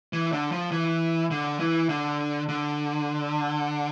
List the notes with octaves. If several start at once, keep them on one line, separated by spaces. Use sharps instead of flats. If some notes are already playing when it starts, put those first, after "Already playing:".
E3
D3
F3
E3
D3
E3
D3
D3